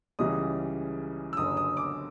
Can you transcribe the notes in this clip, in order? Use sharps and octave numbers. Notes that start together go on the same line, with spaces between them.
C#2 C#3 E3 G3 D#6
E6
F#1 F#2 D3 D#6
D#6
D6